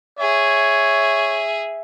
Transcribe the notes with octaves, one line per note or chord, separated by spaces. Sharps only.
G#4 C#5 E5